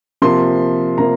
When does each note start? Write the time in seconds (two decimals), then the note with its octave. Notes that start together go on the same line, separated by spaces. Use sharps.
0.22 C3 F3 A#3 C6
0.98 C3 F3 A#3 A#5